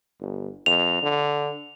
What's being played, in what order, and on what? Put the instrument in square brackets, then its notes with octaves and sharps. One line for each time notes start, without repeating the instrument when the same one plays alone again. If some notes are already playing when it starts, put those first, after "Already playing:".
[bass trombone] G1
[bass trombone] F2 [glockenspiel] F7
[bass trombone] D3